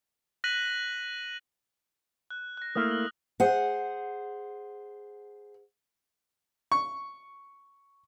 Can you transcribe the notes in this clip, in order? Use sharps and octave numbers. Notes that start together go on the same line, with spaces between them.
F#6 A#6 B6 D#7 F#7
F#6
F#6 A#6
A3 A#3 E4 D#6 F6
F#7
G#4 C5 F#5
C#6